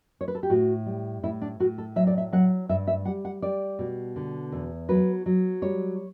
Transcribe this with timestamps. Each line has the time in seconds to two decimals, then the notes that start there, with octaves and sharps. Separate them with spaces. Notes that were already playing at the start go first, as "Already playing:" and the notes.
0.21 C#5
0.28 B4
0.35 A4
0.43 G4
0.50 A2 F#4
0.86 G3
1.23 A2 E4
1.42 D4
1.60 A2 F#4
1.78 A4
1.96 F#3 E5
2.07 D5
2.18 E5
2.32 F#3 F#5
2.69 G2 E5
2.87 E5
3.05 G3 F#5
3.25 F#5
3.42 G3 D5
3.79 B2
4.16 D3
4.52 E2
4.89 F#3 B4
5.26 F#3
5.62 G3 C#5